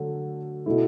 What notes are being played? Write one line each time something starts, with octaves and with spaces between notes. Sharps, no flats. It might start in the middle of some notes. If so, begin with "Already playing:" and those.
Already playing: D3 F#3 A3
B2 A3 E4